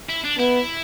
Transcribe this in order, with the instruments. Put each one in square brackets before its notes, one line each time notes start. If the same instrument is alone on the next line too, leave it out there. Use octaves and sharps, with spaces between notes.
[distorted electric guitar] E4
D4
[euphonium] B3 [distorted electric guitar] E4